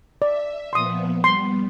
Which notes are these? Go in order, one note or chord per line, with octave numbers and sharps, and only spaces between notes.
D5 E5
A#2 F3 B3 C6 D#6
G3 B3 C6